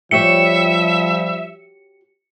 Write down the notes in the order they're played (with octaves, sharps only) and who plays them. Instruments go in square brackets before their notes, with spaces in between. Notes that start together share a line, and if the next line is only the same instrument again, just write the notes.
[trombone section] F3 G3 [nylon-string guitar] F#4 G4 C#5 [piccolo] E5 [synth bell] C#7